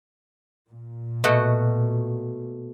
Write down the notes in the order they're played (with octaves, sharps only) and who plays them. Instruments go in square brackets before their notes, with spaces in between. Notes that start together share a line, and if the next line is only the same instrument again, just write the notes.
[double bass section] A#2
[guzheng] B2 A3 F#4